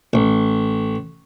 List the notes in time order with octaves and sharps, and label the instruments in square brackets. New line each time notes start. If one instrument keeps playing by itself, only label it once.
[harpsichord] A1